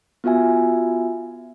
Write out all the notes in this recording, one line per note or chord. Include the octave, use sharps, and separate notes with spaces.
B3 F4 F#4 E5 G#5